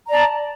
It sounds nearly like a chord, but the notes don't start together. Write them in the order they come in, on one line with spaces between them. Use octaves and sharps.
A#5 D5 A5